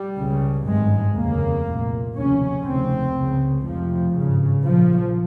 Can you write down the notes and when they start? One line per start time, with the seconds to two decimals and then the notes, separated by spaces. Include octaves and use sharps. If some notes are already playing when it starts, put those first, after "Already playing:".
Already playing: G3
0.18 C#2 C#3
0.67 G#1 G2 G#3
1.16 F1 D#2 C#3 A#3
1.66 C2 A#2
2.16 F1 D#2 C#3 C#4
2.65 F1 D#2 C#3 C4
3.15 C#2 C#3
3.64 F1 F2 C3 F3
4.14 G#1 G2 C#3
4.64 A#1 A#2 F3